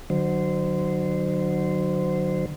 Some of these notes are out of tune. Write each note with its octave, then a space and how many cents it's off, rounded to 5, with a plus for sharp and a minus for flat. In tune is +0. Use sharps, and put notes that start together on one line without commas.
D3 +45 F#3 +0 C5 -15